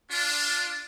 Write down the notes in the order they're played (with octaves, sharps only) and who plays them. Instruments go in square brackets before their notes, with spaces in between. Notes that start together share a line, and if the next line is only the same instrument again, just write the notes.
[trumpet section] D4 F4